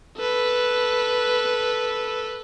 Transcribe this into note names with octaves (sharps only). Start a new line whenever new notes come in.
A4 B4